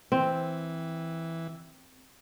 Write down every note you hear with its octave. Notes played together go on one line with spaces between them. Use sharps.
E3 C4